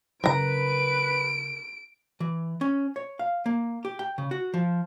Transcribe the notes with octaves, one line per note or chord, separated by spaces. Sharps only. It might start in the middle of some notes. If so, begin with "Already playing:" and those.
C#3 F#3 A#4 B4 A#5 D7
E3
C#4
C#5
F5
A#3
G4
G5
C#3
F#4
F3